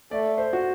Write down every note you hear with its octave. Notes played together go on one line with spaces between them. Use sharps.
A3 D5
C5
F#4